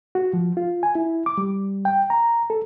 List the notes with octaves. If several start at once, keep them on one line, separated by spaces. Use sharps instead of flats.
F#4
F3
F4
G#5
E4
D6
G3
G5
A#5
A4